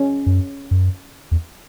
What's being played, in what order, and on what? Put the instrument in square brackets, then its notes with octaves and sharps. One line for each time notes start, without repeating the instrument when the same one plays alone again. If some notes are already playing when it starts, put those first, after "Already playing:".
Already playing: [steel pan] C#4
[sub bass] F#2
F#2
E2